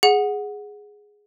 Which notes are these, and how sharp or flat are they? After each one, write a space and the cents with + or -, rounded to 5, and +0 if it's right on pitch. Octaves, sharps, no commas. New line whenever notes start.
G#4 +0 F#5 -10